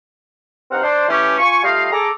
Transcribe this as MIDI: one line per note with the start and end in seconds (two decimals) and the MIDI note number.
0.71 0.83 43
0.71 0.83 60
0.71 0.83 63
0.71 0.83 77
0.71 0.83 78
0.83 1.08 62
0.83 1.08 72
1.09 1.35 52
1.09 1.35 57
1.09 1.35 61
1.09 1.35 67
1.38 1.62 65
1.38 1.62 80
1.38 1.62 85
1.64 1.87 55
1.64 1.87 57
1.64 1.87 65
1.64 1.87 67
1.64 1.87 75
1.64 1.87 77
1.92 2.10 68
1.92 2.10 69
1.92 2.10 82
1.92 2.10 86